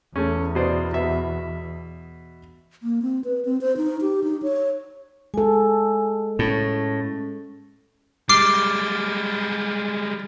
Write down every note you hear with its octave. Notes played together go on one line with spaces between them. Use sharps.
E2 A3 C#4
B2 C5 D5
B2 E5
A#3
C4
B4
C4
C5
D#4
G4
D#4
C#5
G#3 A4 G#5
A2 C#4
G3 G#3 D6 F6 A6 C7